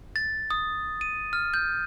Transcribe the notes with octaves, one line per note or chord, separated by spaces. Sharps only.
A6
D#6
D#7
F6
G6